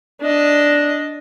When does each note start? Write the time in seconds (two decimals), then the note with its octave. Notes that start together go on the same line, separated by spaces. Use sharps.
0.21 D4 D#5